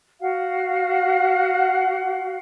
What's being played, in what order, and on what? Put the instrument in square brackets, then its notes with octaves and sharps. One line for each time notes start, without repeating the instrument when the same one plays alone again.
[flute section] F#4 F5 F#5